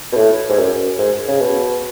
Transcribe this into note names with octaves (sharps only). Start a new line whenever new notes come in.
B2
A2
G#2
F#2
G#2
C#3
B2